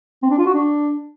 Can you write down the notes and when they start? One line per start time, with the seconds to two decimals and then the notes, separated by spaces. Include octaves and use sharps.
0.23 C4
0.30 D4
0.38 F4
0.46 F#4
0.54 D4